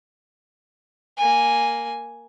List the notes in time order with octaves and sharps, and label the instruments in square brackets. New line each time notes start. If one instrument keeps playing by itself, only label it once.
[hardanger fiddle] A#3 G#5